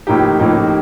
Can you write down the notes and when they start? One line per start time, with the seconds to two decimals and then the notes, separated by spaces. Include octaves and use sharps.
0.07 A2 F3 A#3 D#4 G4
0.39 A2 F3 A#3 D#4 G4